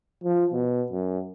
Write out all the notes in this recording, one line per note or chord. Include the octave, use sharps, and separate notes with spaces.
F3
B2
F#2